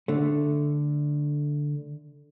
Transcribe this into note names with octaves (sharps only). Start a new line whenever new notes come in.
D3 A3